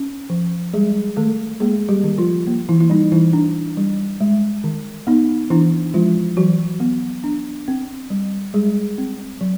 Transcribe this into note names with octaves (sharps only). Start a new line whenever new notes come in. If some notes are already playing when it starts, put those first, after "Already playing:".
Already playing: C#4
F3
G3 G#3 G#4
D#3 A3 A4
G#3 A#3 G#4
G3 G4
D#3
F3 F4
A#3
E3 E4
E4
G3 D#4
E3 E4
D4
G3
G#3
D#3
B3 D#4
E3 D4 E4
F3 G#3 F4
E3 F#3 F#4
B3
D4
C4
G3
G3 G#3 G#4
C4
F#3